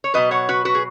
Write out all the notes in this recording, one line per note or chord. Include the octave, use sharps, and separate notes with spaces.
C#5
B2 F#3 B4 D#5
C#5 F#5
F#4 B4
F#4 B4
G#4